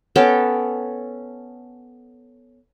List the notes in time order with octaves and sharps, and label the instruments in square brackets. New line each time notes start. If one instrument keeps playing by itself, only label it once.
[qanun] B3 C#4 A4 G5